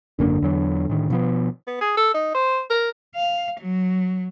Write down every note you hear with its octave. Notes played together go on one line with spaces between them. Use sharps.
G#1 F#2 D3 A#3
E2 F#3
A2 D#3
B2 F3 B3
B3
G#4
A4
D#4
C5
A#4
F5
F#3